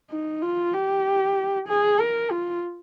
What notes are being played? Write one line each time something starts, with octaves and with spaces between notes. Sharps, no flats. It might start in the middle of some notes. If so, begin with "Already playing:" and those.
D#4
F4
G4
G#4
A#4
F4